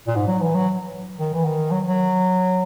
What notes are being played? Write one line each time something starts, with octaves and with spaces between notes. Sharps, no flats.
A#2
G#2
F#3
E3
F#3
D#3
E3
D#3
F#3
F#3